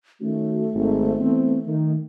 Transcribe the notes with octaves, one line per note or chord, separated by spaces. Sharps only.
D#3 A3 C#4 F#4
G#1
E3 B3 C4
D#3